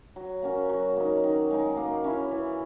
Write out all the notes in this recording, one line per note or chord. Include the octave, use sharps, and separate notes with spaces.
F#3
A#3 C#4 F#4
F#3
A#3 D#4
D#3
G#3 D#4
A#3
C#4 E4
E3